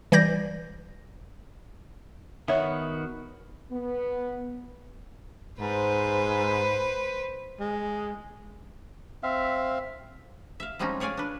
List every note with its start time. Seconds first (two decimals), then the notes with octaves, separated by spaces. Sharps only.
0.12 E3 G3 D5 G6 A#6
2.48 D#3 B3 F#4 C#5 E5
3.71 B3
5.60 G#2 B4 C5
7.60 G#3
9.23 C4 E5 F5
10.60 E5 F5
10.79 F3 G3 G#3 C4 C#4 D#4
11.00 G#4 C#5 D5 F5 G#5
11.17 D4 B4